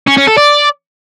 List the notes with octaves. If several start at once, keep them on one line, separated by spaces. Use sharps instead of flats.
C#4
C#4
A4
D5